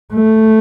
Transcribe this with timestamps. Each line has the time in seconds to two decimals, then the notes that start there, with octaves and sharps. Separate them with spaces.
0.14 A3